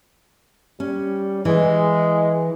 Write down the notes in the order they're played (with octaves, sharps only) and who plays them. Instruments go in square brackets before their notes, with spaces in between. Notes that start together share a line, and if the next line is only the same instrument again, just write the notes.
[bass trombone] G3 [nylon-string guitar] C#4
[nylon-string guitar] E3 [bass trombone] G#3